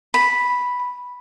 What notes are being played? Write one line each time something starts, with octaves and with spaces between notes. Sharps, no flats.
B5